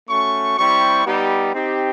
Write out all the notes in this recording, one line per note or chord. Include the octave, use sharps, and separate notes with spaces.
A3 C#4 F#4 C#6
G3 C4 E4 G4 C#6
G3 B3 D#4 G4
C4 D#4 G4